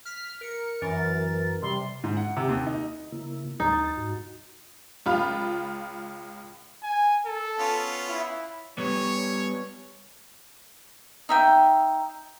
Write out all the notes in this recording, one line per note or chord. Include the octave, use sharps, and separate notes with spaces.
F6 B6
A#4 C#7
F#2 E3 A#4 A6
C3 G3 C6
G#2
F#5
C3
D#2
D#4
C#3 A#3 E4
D2 D#4 A6
G#2 F#4
C#2 F4 B5 F6
G#5
A4
B3 C#4 F4
E4
G3 B3 C#5
D#4 E5 G5